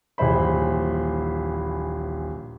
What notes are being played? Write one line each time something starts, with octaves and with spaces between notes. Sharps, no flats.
D#1 A#1 E3 E4 C5 B5